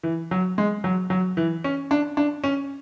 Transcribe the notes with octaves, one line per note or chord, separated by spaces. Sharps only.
E3
F#3
G#3
F#3
F#3
E3
C#4
D4
D4
C#4